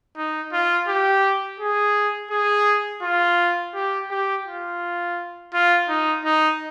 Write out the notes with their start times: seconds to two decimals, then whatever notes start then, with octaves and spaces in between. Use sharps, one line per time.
0.17 D#4
0.53 F4
0.88 G4
1.60 G#4
2.31 G#4
3.03 F4
3.75 G4
4.11 G4
4.46 F4
5.54 F4
5.89 D#4
6.25 D#4